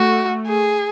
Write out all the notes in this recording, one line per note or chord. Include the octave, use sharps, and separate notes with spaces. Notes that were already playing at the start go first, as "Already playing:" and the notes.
Already playing: A3 F#4
G#4